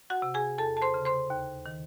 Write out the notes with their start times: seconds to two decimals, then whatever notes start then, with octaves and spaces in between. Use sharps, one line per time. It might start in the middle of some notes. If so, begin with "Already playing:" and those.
0.10 F#4 F#5
0.22 C3
0.34 G#4 G#5
0.58 E2 A4 A5
0.77 A5
0.82 C5 C6
0.94 C#3
1.05 C5 C6
1.30 D#2
1.66 D#3